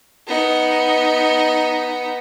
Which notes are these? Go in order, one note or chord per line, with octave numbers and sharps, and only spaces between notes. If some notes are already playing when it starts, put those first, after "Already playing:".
B3 D#4